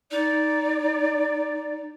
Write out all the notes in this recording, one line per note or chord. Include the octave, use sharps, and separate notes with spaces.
D#4 D5